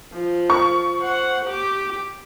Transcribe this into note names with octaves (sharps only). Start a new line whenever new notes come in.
F3
C#6
C5 F#5
G4 D6